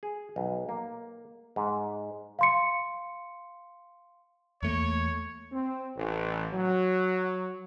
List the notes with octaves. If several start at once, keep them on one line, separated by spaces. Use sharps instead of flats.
G#4
B1
A#3
G#2
F5 C6 C#7
E2 A3 A#3 C#5
C4
A1
F#3